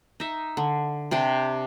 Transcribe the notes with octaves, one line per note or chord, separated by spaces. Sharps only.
D#4 E5
D3
C3 D4 G4